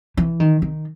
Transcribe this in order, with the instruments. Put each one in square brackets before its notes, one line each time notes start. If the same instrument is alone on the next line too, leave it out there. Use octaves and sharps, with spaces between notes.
[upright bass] E3
D#3
D#3